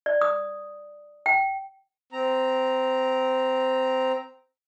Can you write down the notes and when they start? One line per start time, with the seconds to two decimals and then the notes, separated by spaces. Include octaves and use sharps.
0.06 D5
0.21 D#6
1.26 G5
2.12 C4 A#5